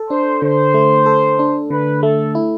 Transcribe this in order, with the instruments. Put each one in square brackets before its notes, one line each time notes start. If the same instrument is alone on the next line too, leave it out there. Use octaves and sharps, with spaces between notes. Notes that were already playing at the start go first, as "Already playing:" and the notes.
Already playing: [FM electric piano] A4
[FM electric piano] D4 [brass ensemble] C5
[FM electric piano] D3 [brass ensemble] C5
[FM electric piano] A3
A4
D4
[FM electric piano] D3 [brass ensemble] B4
[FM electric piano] A3 [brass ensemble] A4
[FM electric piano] E4